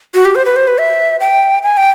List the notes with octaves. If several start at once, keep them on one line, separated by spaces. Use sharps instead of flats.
F#4
G4
C5
B4
C5
B4
E5
G5
G#5
G5